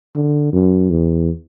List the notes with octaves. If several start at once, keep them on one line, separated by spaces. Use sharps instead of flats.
D3
F#2
E2